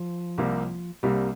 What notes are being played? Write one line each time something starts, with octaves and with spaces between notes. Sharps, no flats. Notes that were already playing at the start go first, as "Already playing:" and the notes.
Already playing: F3
C2 C3 G3 A#3
C2 C3 G3 A#3